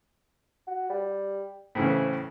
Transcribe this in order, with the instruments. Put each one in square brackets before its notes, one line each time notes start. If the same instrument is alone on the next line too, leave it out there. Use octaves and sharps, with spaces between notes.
[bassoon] F#4
G3
[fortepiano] A2 C#3 E3 [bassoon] C4